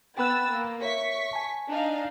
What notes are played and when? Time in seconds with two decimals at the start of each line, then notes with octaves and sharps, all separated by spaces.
0.18 B3 G5 B5 E6 F#6 A6
0.50 A#3
0.82 C#5 E5 C#6 B6
1.33 G#5 A5
1.68 D4 D#4 F5